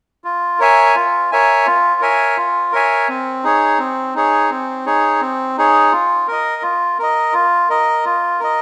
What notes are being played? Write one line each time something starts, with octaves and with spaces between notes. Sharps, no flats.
F4
A#4 C#5 E5 G#5
F4
A#4 C#5 E5 G#5
F4
A#4 C#5 E5 G#5
F4
A#4 C#5 E5 G#5
C4
D#4 G#4 C#5
C4
D#4 G#4 C#5
C4
D#4 G#4 C#5
C4
D#4 G#4 C#5
F4
A#4 D#5
F4
A#4 D#5
F4
A#4 D#5
F4
A#4 D#5